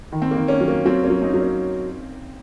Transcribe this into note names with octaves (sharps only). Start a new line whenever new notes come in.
D#3
C4
A#3
D#3
A#3 C#4
F#3
A#3
F#3 C4
A#3 C#4
F#3
C4 D#4
F#3
A#3 C#4